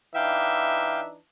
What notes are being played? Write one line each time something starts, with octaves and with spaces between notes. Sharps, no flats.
E3 D4 D#4 E5 F5 G5